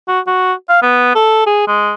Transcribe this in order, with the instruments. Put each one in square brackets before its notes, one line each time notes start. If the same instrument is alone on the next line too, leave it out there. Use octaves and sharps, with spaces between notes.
[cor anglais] F#4
F#4
F5
B3
A4
G#4
G#3